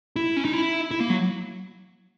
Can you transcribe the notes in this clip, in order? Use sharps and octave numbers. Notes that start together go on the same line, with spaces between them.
E4
C#4
D#4
E4
E4
A#3
F#3